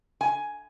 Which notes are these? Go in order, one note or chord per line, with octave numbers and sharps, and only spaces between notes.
G#5